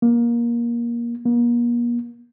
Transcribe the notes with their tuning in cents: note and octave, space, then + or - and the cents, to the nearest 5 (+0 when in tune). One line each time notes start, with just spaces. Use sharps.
A#3 +20
A#3 +40